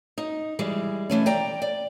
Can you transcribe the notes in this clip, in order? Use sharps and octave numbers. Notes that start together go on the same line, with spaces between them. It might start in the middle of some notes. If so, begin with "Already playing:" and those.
D#4
E3 G3 G#3
B2 E3 A3 C#4
D5 G5 A#5
D5